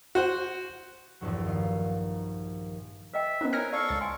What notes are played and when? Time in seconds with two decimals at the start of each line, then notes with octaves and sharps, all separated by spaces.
0.15 F#4 C5 F#5
1.21 A#1 E2 G2 F#3
1.45 D#3 F5
3.14 B4 D#5 E5 G5
3.41 B3 C#4 D#4 F4 A#4 C5
3.53 E4 A#4 C#5 G#5 F6 A#6 C#7
3.73 A4 D5 F5 C#6
3.89 C#2 A6
4.01 G#5 C6